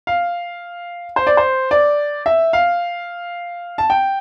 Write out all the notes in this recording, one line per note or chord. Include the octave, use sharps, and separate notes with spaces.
F5
C5
D5
C5
D5
E5
F5
A5
G5